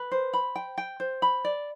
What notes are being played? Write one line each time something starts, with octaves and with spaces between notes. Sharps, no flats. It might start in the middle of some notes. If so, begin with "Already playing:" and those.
Already playing: B4
C5
B5
G5
G5
C5
B5
D5